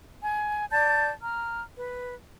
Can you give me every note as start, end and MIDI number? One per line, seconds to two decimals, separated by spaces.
0.22 0.65 80
0.71 1.09 74
0.71 1.09 81
0.71 1.09 91
1.21 1.61 82
1.21 1.61 89
1.76 2.14 71